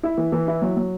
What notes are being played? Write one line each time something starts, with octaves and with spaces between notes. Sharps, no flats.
E4
E3
E3
E4
F#3
F#3